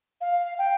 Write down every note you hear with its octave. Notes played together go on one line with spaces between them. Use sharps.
F5
G5